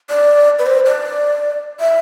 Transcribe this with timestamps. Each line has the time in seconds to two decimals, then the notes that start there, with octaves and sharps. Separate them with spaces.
0.10 D5
0.59 B4
0.66 C5
0.86 D5
1.80 E5